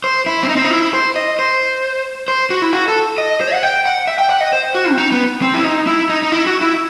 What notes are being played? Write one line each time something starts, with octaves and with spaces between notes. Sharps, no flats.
C5
E4
C4
D#4
C4
D#4
E4
C5
D#5
C5
C5
F#4
E4
F#4
A4
D#5
C5
F#5
G5
F#5
E5
G5
F#5
D#5
C5
F#4
C4
D#4
B3
C4
E4
D#4
E4
D#4
D#4
E4
F#4
E4